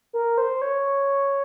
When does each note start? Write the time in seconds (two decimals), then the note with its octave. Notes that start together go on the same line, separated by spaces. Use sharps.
0.13 A#4
0.38 C5
0.62 C#5